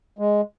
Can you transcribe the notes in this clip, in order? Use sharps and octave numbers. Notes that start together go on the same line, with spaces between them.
G#3